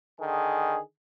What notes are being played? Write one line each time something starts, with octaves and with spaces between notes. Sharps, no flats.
D3 D#3 G#4